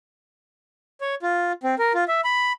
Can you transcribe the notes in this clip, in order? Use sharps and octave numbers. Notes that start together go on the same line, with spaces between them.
C#5
F4
C4
A#4
F4
E5
B5